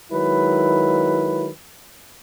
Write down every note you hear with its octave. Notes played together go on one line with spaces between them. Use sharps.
D#3 F#3 G#3 E4 B4